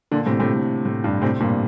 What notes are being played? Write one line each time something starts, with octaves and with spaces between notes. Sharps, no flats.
A#2 D3
A2 C3
A2 C3
A2
A2
G2
A2 C3
G2 A#2